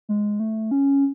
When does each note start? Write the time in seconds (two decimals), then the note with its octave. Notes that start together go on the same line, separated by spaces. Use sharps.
0.09 G#3
0.40 A3
0.71 C#4